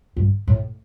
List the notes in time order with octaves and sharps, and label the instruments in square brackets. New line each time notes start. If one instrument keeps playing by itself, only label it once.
[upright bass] G2
A2